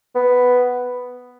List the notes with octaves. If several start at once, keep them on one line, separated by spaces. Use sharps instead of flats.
B3